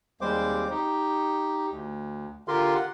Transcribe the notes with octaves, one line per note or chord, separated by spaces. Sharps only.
D#2 G3 G#3 C4 C5 D6
D#4 G4
D2
D3 F4 G4 A#4 C6
F#5